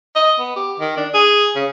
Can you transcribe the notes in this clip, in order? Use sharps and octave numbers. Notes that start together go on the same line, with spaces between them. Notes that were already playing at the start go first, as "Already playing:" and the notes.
D#5
B3
G4
D#3
D4
G#4
C#3